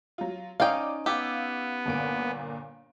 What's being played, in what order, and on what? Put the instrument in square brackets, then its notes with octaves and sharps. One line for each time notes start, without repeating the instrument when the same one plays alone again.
[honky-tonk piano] F#3 F4
[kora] C#4 D#4 [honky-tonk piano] D5 D6 D7 [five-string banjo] F5 G5
[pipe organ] B3 [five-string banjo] G4 [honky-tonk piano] F5 D6 E6
[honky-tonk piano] G1 A#2 D7